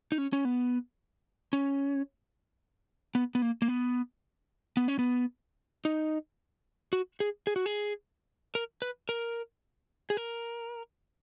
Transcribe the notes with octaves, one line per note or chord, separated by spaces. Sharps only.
D#4
C#4
C#4
B3
C#4
B3
B3
A#3
A#3
B3
B3
C#4
B3
D#4
F#4
G#4
G#4
F#4
G#4
A#4
B4
A#4
G#4
A#4